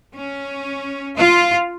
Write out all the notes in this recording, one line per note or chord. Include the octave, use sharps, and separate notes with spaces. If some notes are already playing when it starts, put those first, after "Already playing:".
C#4
F4